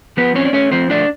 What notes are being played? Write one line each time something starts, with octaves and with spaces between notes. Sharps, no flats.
F3 B3 B4
C4 C#4 C#5
D5
A3 C#4 C#5
F3 C4 C5
A3 D4 D5